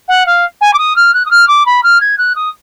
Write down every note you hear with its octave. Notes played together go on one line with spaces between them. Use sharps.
F#5
F5
G#5
D6
D#6
F6
F#6
D#6
F6
D6
B5
F6
G#6
F#6
D#6